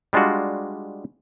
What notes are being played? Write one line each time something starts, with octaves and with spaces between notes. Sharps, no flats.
G3 G#3 D4 F4 F#4